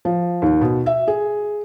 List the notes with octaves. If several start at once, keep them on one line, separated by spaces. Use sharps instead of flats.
F3
D#2
B2
E5
G#4